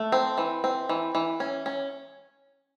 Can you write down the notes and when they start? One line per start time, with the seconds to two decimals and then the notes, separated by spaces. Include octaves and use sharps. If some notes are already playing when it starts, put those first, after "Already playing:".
Already playing: A3
0.12 C4
0.38 E3
0.64 C4
0.89 E3
1.15 E3
1.40 C#4
1.66 C#4